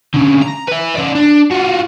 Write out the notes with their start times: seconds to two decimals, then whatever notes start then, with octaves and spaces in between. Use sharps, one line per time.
0.14 D3 C#4
0.42 A#5
0.68 B4 E5
0.96 C#3 D5
1.15 D4
1.52 F4 F#4